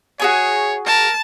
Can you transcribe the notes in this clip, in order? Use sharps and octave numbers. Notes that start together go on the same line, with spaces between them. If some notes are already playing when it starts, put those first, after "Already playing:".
F#4 G#4 C#5 G#5
A#4 A5